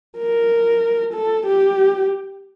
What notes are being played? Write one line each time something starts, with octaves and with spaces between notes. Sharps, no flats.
A#4
A4
G4